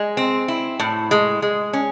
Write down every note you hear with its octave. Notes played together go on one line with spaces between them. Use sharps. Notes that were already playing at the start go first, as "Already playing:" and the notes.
Already playing: G#3
C4
E4
A2
G#3
G#3
C#4